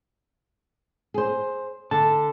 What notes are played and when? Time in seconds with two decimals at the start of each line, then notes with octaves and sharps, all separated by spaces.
1.14 G#4 C5
1.91 D3 A5